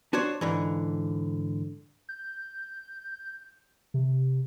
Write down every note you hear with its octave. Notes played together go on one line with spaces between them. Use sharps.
D4 F#4 C5 C#5
G#2 D3 E3
G6
C3